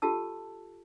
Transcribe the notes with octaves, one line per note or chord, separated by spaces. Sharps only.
F4 G4 A4 A5 E6